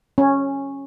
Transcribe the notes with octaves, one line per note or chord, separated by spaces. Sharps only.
C#4